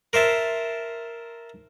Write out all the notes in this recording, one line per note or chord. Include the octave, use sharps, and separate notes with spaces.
A#4 C5 E5 A5